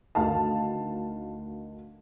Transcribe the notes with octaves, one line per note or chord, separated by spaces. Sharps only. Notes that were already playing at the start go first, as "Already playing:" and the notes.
D2 D#3 F5 A5